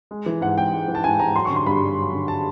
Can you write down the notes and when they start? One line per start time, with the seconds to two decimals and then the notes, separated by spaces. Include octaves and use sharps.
0.11 G#3
0.26 E3
0.41 G#2 F#5
0.57 G#2 G5
0.73 G#3
0.88 E3
0.95 A5
1.04 G#2 G#5
1.19 G#2 A#5
1.35 F#3 C6
1.45 C#6
1.50 D3
1.56 C6
1.66 G2 B5
1.81 G2
1.98 F#3
2.13 D3
2.28 A5